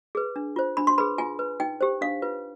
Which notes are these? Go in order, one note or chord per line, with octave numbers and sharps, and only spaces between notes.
G#4 B4
D4
F4 C5
D4 B5
C6
G#4 B4 B5
F4 G#5
B4
D#4 G5
G4 C5
D4 F5
F4 B4